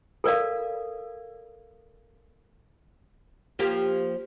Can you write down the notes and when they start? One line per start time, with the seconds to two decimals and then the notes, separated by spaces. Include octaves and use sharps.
0.24 A4 A#4 D5 F5
3.59 F3 A#3 G4